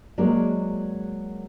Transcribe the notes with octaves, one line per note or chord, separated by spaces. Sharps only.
F#3 G#3 A#3 D4